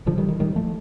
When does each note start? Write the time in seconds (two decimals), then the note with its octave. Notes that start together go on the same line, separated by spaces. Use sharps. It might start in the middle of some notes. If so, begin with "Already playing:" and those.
0.06 A2 D3 F3
0.18 D#3 G3
0.28 D#3
0.39 A2 D#3 G3
0.56 F3 A3